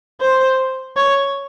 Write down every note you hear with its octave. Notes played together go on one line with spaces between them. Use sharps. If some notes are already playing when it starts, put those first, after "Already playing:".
C5
C#5